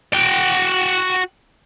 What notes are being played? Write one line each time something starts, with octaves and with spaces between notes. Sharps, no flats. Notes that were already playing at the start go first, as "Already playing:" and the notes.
F#4 G5